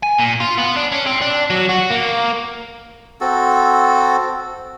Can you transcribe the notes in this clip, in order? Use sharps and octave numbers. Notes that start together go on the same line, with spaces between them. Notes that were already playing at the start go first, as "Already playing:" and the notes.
G#5
A#2
F4
B3
D4
C#4
C4
D4
F#3
F#4
A#3
C4 F#4 A4